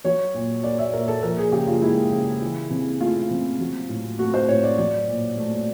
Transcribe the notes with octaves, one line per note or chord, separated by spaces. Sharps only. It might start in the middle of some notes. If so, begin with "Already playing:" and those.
F#3 C#5
A#2
A#3 D5
E5
A#2 A#4
A4
F3 A#4
G#4
C#3 G4
F4
G#3 E4
C#3
E3
C3
A3 F4
C3
F#3
A2
A3 F#4
C5
A2 C#5
D5
F#3 D5
A#2
A3